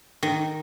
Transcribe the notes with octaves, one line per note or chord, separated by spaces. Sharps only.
D#3